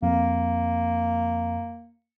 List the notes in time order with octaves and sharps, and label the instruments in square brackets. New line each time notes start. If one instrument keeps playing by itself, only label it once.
[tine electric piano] F2 [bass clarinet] A#3